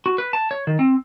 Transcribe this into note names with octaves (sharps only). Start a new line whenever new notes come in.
F#4
B4
A5
C#5
D#3
C4